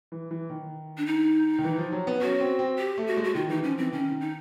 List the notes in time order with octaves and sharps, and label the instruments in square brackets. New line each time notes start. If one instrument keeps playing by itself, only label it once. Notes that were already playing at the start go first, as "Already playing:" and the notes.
[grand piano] E3
E3
D#3
[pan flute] D4
D#4
[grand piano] D#3
E3
F3
F#3
B3
[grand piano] C#4 [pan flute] F#4
[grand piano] C4
C4
[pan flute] G4
[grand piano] A3
[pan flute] F#4
[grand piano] G#3
[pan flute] F#4
[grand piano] D#3 [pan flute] F4
[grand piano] E3 [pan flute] D#4
[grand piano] F3 [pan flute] C#4
[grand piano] E3 [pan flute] C4
[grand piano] D#3 [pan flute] C#4
[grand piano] D#3
[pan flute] D#4